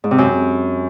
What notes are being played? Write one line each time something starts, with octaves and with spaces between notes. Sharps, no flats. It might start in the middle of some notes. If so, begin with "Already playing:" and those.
G#2
C3
F#2